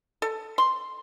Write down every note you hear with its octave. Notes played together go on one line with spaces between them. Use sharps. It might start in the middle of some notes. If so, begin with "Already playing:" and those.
A4
C6